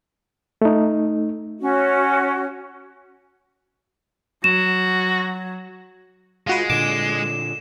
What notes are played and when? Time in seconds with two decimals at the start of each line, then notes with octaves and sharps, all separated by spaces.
0.62 A3 D#4
1.61 C#4 F#4
4.44 F#3 F#4 E7
6.47 G#3 F4 F#4 B4
6.70 A#2 D3 D6 E7